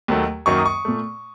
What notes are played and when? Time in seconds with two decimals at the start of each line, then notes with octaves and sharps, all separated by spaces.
0.08 D#2 D#3 F#3 A3
0.46 F#2 D#3 F#3 A#3 C#6
0.58 D#6
0.66 C#6
0.85 A#2 A3